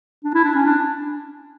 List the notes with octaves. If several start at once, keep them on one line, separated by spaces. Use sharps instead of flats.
D4
E4
D4
C#4
D4